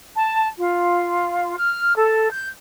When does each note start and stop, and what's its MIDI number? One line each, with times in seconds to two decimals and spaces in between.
0.15 0.48 81
0.59 1.57 65
1.57 1.95 89
1.95 2.27 69
2.30 2.48 91